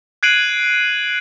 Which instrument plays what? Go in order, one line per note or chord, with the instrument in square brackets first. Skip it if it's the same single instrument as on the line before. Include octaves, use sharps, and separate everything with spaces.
[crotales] F#6 G#6 C7 D7 D#7 F#7